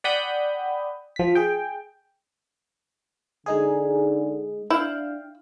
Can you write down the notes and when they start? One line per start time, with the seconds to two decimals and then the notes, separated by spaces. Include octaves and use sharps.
0.04 D5 F#5 G5 B5 D#6 G6
1.16 F3 B6
1.35 G#4 G5
3.46 D3 G#3 D#4 G#4
4.70 D4 E4 F5 G5